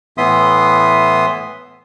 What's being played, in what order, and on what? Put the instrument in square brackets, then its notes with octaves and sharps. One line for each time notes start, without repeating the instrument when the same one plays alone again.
[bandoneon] A2 E3 B3 E5 C6 D#6